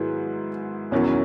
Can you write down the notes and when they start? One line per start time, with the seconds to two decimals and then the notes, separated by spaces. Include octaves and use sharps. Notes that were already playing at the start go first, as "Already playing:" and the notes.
Already playing: G#2 D#3 F#3 B3 E4 G#4
0.91 E1 E2 D#3 F#3 C#4 E4